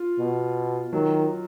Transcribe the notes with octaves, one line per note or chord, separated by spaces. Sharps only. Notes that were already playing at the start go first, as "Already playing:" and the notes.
Already playing: F4
B2
D#3 F#3